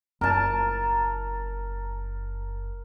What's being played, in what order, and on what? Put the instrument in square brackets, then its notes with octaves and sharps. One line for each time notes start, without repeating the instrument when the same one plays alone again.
[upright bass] F#1 [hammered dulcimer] A#4 A5